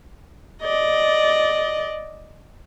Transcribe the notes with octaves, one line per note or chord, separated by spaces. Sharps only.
D5 D#5